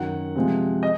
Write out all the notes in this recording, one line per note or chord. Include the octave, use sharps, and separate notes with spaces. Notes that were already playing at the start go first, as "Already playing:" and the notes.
Already playing: F#2 D#3 F#3 F#5
C3 F3 G#3
D#5